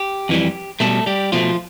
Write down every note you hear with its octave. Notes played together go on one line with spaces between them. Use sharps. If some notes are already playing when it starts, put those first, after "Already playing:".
Already playing: G4
F2 E3 G3
B2 G3 A3 A4
G3 G4
B2 F3 A3 F4